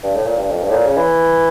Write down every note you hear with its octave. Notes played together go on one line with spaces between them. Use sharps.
G2
A2
A#2
G2
F2
G2
A2
A#2
C#3
E3